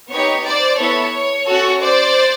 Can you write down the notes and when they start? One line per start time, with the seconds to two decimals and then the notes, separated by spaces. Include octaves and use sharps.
0.11 B3 D#4 G4 C#5
0.45 C5 D5
0.79 B3 E4 A4 C#5
1.47 C#4 F#4 A4
1.80 C5 D5